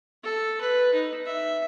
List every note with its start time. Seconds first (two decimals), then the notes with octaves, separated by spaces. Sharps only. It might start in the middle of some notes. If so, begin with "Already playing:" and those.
0.23 A4
0.61 B4
0.93 D#4
1.26 E5